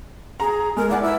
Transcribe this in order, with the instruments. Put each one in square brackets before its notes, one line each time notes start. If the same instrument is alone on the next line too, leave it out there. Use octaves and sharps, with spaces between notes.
[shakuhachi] G#4 [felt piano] A#5
[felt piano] G#3 [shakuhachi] A#4
[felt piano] E4 F#5 G#5 [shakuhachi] D5
[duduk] E4 [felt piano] B4 [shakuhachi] E5